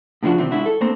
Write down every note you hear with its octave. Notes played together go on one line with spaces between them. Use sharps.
A2 C#3 F3 D4 F#4
C3 D#3 E3 G3 C4
G#2 B2 D4 E4 F#4
A4
A3 A#3 C4 D4 C5 A#5